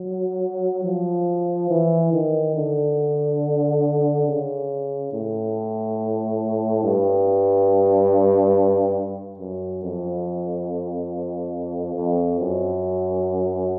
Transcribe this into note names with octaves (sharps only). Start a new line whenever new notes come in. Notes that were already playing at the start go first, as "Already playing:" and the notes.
Already playing: F#3
F3
E3
D#3
D3
C#3
A2
G2
F#2
F2
F2
F#2